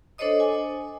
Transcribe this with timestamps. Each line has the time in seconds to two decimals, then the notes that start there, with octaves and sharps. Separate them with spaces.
0.18 D4 A4 C5 C#5 D#5 D#6
0.40 G#5